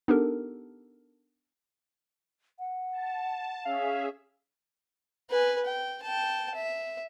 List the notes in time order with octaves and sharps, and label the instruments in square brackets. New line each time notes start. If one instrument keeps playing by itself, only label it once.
[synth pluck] B3 D4 D#4 G4 A4 A#4
[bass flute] F#5
[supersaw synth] A5
[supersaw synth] C#4 G#4 E5 [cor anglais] F5
[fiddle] B4 G#5
G5
G5 A5
E5